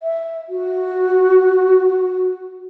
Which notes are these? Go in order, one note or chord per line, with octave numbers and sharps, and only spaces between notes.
E5
F#4